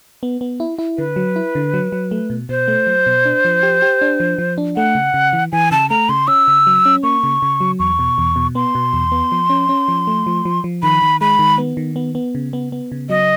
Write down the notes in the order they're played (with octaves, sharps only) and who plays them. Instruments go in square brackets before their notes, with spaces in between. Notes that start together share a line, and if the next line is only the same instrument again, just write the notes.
[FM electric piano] B3
B3
E4
E4
[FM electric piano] D3 [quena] B4
[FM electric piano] F#3
E4
D3
F#3
F#3
A3
B2
[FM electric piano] B2 [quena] C5
[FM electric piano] A3
F#3
B2
D4
F3
G4
G4
D4
F3
F3
D4
[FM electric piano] A3 [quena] F#5
[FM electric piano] C#3
C#3
E3
[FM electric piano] E3 [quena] G#5
[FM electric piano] C#3 [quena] A5
[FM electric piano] A3 [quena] A#5
[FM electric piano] C#3 [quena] C6
[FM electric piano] C#4 [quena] E6
[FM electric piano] C#3
F#3
C#4
[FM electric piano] A#3 [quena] C#6
[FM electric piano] C#3
C#3
F#3
[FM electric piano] E2 [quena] C#6
[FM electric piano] B2
E2
B2
[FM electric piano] B3 [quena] C6
[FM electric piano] B2
E2
B3
F3
C#4
C#4
F3
A3
F3
F3
F3
[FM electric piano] D#3 [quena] B5
[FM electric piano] D#3
[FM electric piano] G#3 [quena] B5
[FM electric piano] D#3
B3
D#3
B3
B3
C#3
B3
B3
C#3
[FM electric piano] F#3 [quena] D#5